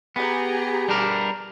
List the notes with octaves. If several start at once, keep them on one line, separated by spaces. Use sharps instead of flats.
B3 G4 G#4 A#5
G3 D4 A#4